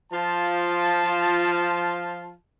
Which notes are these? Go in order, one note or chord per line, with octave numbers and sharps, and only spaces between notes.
F3 F4 A5